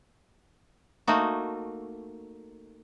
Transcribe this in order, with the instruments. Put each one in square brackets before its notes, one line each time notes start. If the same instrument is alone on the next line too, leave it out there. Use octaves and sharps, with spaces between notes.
[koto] A3 A#3 D#4 F#4